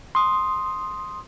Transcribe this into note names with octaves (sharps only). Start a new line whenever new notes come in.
C6 D#6